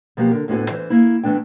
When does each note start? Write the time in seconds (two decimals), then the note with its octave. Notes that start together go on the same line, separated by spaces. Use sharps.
0.17 B2 F3 F#3 A#3 F#4 G4
0.31 D3 A#4
0.48 D2 A2 D3 B3 F#4 G#5
0.71 E3 C5
0.90 A#3 E4
1.24 E3 A3 B3 D4 G5